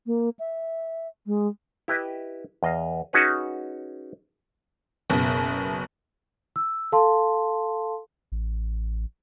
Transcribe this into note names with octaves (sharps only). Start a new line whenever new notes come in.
A#3
E5
G#3
E4 G4 B4 D#5 E5
E2 D#5 F5
C#4 D#4 F#4 G#4 B4 C#5
F#1 B2
E6
A4 F5 A5 C6
A1